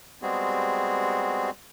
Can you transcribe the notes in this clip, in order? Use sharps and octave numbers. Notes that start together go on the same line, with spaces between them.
G3 G#3 B3 C4 F#4 G#4